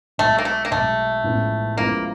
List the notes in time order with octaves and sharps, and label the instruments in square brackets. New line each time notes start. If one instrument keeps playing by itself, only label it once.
[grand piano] B1 B2 G#3 [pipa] A3
[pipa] A#3
A3
A#3
[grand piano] B1 B2 G#3 [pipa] A3
[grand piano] A1 A2 F3 G#3 B3
[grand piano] A1 A2 F3 G#3 B3 [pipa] A#3